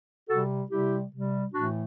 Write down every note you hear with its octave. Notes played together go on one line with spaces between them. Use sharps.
C3 G3 F#4 A4
C3 G3 E4 G4
C3 G3
A2 E3 A3 D4 F#4